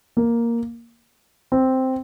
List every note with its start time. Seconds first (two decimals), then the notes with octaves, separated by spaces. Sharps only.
0.17 A#3
1.52 C4